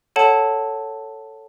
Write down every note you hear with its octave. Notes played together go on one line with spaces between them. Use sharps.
A4 C#5 F#5 A5